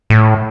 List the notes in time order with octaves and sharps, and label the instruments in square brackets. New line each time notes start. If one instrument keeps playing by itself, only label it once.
[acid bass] A2